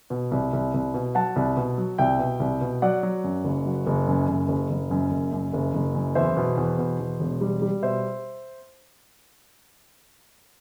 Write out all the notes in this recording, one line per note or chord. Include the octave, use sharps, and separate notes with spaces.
B2
C2
C2
C2
B2
F#3 F#5 A5
C2
B2
F#3
C2 E5 G5
B2
C2
B2
F#3 D5 F#5
F#3
F#2
F#1
F#3
F#1
F#2
F#1
F#1
F#1
F#2
F#1
F#2
F#1
F#1
F#2
E2 C5 E5
B2
E2
B2
E2
E1
G3
G3
B2 C5 E5